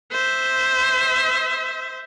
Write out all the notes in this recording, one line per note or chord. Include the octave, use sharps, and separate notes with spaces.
C5 E5